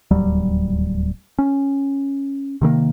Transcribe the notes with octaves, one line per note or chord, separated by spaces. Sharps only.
D1 D#2 F#3 G3
C#4
C3 D#3 G#3 A#3